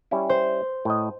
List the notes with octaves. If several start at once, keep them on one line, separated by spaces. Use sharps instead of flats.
G3 C#4 E4
C5
A2 D#5